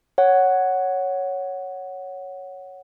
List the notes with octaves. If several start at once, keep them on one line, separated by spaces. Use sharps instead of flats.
C#5 F#5